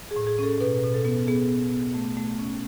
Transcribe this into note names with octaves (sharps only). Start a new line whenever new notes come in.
G#4
A2
G#4
C#4 A4
B2 B4
B2
A4
B3
B3 G#4
B3
B3
A3
A3
C#4